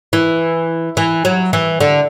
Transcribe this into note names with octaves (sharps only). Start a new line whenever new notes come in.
E3
E3
F#3
E3
D3